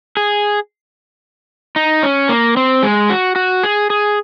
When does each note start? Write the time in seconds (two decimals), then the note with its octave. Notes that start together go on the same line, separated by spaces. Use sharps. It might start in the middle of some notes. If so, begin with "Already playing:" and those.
0.17 G#4
1.76 D#4
2.03 C#4
2.29 A#3
2.57 C4
2.83 G#3
3.10 F#4
3.36 F#4
3.63 G#4
3.90 G#4